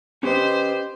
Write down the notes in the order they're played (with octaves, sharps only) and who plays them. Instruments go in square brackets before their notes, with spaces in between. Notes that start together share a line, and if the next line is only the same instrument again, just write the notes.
[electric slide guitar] C#4 B4 D#5 [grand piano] G4 [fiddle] C5